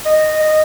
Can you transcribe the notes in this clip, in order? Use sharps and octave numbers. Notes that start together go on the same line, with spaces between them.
D#5
D#5